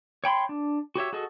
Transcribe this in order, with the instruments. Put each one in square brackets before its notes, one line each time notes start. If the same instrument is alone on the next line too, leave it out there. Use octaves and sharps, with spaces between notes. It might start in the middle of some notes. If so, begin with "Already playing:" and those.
[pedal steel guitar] C#5 G5 B5 C6
D4
F#4 G4 C#5 E5
F#4 G#4 A4 D#5